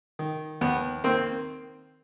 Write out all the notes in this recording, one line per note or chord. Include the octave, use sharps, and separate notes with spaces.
D#3
D#2 B3
D#3 A#3 C4